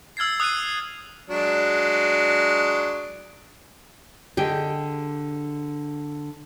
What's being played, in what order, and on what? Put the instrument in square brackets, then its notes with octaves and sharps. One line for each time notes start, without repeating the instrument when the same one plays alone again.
[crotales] E6 F6 G#6 A6 C7
D#6 F#6 G#6 C7 D#7
[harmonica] F#3 G#3 D4
[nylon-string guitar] D3 G#4 D#5 [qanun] G4 G5